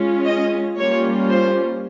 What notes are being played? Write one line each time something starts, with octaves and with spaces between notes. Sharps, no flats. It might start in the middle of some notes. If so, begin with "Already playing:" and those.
Already playing: G#3 C#4 F4
D#5
G3 A#3 C#4 F4 C#5
C5